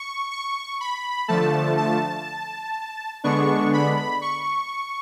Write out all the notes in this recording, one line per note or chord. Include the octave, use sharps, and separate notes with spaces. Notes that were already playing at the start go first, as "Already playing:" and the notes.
Already playing: C#6
C#6
B5
D3 F3 A3 A5
A5
D3 G#3 B3 D4 C#6
B5
C#6